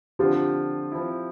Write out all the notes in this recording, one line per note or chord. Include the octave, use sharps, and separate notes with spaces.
D3 F3 C4 F4 G4
F3 C4 E4